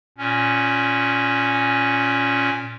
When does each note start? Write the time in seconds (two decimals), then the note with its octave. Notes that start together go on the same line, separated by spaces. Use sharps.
0.18 A#2 C#4